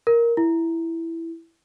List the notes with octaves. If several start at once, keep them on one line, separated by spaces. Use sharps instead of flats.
A#4
E4